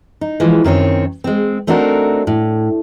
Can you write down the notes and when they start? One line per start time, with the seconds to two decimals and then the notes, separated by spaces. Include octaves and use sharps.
0.21 D#4
0.40 E3 F3 G#3
0.64 F#2 D#3 C4 C#5
1.24 G#3 C4
1.67 A3 C4 D4 D#4 F#4 A#4
2.27 A2